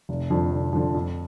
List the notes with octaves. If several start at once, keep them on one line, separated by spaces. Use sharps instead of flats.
F1
F2 D3 F3
F1
F2 D3 F3
F2